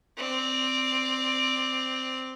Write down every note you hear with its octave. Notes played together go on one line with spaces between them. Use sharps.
C4 D5